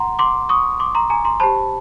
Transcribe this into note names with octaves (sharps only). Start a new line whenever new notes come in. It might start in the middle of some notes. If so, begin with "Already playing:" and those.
Already playing: F#5 A#5 C6
C6 D6
C#6 D#6
C6 D6
A#5 C6
G#5 A#5
A#5 C6
G4 C5 A5 B5